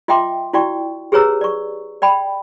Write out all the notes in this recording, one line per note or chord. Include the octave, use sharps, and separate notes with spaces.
F4 D#5 E5 G5 C6 D6
E4 F#4 D5 G5 C#6
G4 G#4 B4 C#5 A#5 E6
D5 C#6
D5 G5 B5